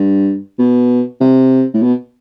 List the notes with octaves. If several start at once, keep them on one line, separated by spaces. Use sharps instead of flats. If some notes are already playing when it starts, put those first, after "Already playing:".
Already playing: G2
B2
C3
A2
B2